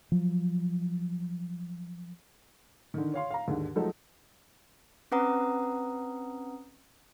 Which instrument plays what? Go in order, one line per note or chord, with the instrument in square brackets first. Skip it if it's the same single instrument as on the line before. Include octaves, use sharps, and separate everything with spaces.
[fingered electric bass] F3 F#3
[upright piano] D3 D#3
C#5 F5 C6
F5 A#5
D#2 G#2 D3
F3 F#3 G#3 A3 D#4 A4
[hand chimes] C4 C#4 B4 F#5 A#5 D#6